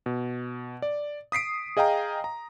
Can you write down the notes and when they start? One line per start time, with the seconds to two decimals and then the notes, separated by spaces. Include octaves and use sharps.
0.06 B2
0.82 D5
1.32 D#6 B6 C7 D7
1.77 G#4 D#5 F5 G5 A#5
2.24 A#5